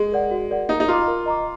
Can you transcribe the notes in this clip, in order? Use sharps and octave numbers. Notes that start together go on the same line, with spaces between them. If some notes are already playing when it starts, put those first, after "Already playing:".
Already playing: G#3
A#4 D5 F#5
F#4
A#4 D5 F#5
D#4 A#4
D#4
F4 D#5 A#5 D6
A#4
D#5 A#5 D6